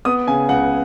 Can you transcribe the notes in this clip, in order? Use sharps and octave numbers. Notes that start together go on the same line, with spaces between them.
B3 D#6
C#3 G#5
C#2 F#5